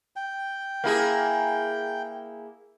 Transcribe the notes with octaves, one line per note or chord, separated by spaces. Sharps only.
G5
A#3 E4 G#4